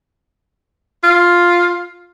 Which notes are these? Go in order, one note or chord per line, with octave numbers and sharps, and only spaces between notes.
F4